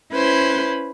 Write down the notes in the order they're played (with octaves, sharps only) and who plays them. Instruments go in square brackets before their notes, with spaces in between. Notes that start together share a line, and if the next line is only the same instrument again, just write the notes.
[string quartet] C#4 E4 B4 C5 G6